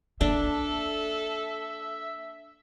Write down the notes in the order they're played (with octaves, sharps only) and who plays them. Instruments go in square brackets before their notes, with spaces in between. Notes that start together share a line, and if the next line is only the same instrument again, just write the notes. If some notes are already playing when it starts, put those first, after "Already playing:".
[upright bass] A#3 [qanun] D4 [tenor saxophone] A4 [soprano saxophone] E5